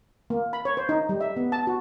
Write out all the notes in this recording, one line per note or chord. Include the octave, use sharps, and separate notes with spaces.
A#3
B5
C#5
C5
D#4
G3
E5
B3
A5
F#4